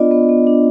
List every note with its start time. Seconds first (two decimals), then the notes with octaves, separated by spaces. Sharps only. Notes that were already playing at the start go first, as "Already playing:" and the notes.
Already playing: B3 D4 F4 D5 D#5
0.11 B3
0.29 B3
0.47 D4